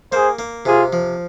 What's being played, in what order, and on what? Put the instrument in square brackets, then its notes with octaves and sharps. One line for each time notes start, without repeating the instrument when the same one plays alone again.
[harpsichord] A#3 [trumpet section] G#4 C5
[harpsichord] A#3
[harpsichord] C3 [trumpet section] F4 G#4
[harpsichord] F3